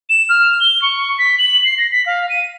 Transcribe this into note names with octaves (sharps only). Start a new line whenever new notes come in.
E7
F6
G7
C#6
B6
F#7
C7
A#6
B6
F5
D#7